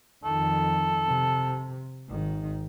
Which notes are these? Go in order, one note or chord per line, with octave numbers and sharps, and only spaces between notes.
F2 D#3 A4
C3
G#1 D#3